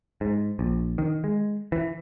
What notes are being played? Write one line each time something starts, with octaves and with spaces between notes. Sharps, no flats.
G#2
A#1
D#3
G#3
E3